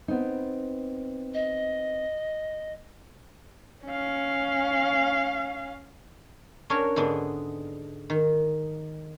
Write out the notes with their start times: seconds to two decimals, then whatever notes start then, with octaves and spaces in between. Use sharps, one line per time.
0.08 B3 C4 D#4
1.34 D#5
3.86 C#4 F5
6.70 C#4 D4 F#4 A#4 C#5
6.96 G#2 D3 G#3 B3 D4
8.10 D#3